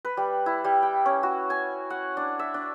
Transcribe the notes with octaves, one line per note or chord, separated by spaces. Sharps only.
B4
G3
E4
G3
G5
C#4
F#4
G#5
F#5
D4
E5
D4